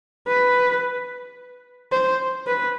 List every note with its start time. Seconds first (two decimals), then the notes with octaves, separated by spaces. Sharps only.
0.28 B4
1.92 C5
2.47 B4